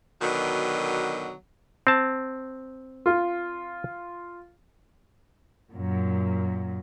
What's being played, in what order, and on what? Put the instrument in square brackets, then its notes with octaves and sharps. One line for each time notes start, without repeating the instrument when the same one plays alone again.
[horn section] B2 D3 D#3 F#3
[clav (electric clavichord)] C4 A5
[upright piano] F4
[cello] F#2 A#2